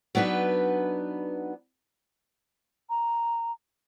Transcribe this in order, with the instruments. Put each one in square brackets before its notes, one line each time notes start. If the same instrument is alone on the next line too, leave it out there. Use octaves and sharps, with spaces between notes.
[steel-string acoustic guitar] F#3 B3 D4 D#4 B4
[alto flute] A#5